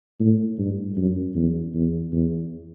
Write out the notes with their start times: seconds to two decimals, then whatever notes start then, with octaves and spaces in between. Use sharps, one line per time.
0.20 A2
0.58 G2
0.97 F#2
1.35 E2
1.74 E2
2.12 E2